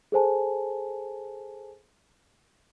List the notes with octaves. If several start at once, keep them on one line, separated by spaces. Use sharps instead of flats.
G#4 A4 C5 G#5 A5